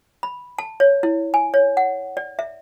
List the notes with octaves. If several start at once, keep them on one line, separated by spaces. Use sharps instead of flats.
B5
A5
C#5
E4
G#5
C#5
F#5
D5
E5